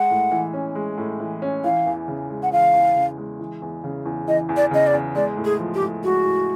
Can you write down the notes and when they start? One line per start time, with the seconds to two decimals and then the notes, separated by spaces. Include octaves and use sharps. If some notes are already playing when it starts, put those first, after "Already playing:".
Already playing: G#3 F#5
0.11 A2
0.31 E3
0.54 C#4
0.75 G#3
0.98 A2
1.20 E3
1.42 C#4
1.64 E3 F5
1.86 E2
2.08 C#3
2.30 G#3
2.43 F#5
2.51 E3 F5
2.73 E2
2.96 C#3
3.18 G#3
3.40 E3
3.62 E2
3.84 C#3
4.05 E2
4.28 E3 D#5
4.49 E2
4.57 D5
4.71 C#3 D#5
4.87 D5
4.93 E2
5.15 G#3 D5
5.37 A2
5.45 G#4
5.59 F3
5.74 G4
5.81 A2
6.03 G#3 F#4
6.25 A2